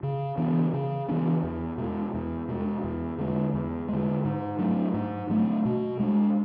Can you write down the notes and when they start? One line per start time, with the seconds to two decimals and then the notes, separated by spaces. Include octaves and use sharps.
0.03 C#3
0.38 E3 B3 D4
0.73 C#3
1.08 E3 B3 D4
1.43 E2
1.78 B2 G#3
2.14 E2
2.48 B2 G#3
2.83 E2
3.18 D3 G#3
3.53 E2
3.89 D3 G#3
4.24 G#2
4.58 F#3 A3 D4
4.94 G#2
5.30 F#3 A3 D4
5.65 B2
5.99 G#3 B3 D4